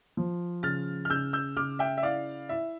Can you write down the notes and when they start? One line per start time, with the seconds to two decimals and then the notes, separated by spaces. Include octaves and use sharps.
0.17 F3
0.63 C#3 F6 A6
1.05 F6
1.10 C#3 E6 G6
1.33 E6 G6
1.56 C#3 D6 F6
1.79 E5 G5
1.97 E5
2.03 E4 D5 F5
2.49 E4 E5